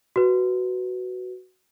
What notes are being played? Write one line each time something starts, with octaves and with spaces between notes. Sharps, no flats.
F#4 B4